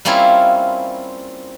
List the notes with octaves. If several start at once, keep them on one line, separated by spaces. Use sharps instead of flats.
G3 A#3 C4 C#4 E4 F4